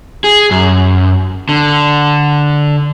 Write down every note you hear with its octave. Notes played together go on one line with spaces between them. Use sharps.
G#4
F#2
D3